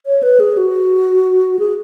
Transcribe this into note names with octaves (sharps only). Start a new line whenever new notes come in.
C#5
B4
G#4
F#4
G#4